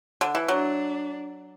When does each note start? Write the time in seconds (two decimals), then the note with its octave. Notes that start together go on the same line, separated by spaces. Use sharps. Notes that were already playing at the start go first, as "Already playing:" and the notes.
0.21 D3
0.35 E3
0.48 F#3 D4